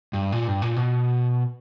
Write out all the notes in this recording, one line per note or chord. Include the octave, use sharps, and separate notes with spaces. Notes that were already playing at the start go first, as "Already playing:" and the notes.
G2
A#2
G2
A#2
B2